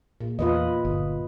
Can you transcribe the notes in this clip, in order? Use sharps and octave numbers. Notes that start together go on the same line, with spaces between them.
A#2
E2 F4 B4 D#5
G1